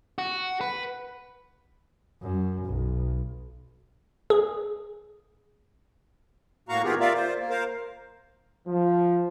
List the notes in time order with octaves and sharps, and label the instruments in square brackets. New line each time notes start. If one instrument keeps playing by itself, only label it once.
[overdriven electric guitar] F#4
B4
[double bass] F#2
B1
[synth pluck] G#4
[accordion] A2 A#3 F#4 F5 A#5 C#6
D#3 B3 F4 G4 G#4 A#4
F4 A#4 D5 E5 F5
F4 C5
A#3
A#4 C5 F5
[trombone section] F3